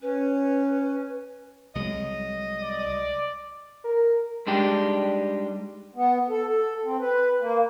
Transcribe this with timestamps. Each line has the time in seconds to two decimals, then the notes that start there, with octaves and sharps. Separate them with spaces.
0.02 C#4 B4
1.75 C2 F#3 G#3 D#5
2.63 D5
3.84 A#4
4.47 G3 G#3 D4 D#4 G4
5.95 B3
6.30 A4
6.48 A4
6.85 C4
7.00 B4
7.41 A#3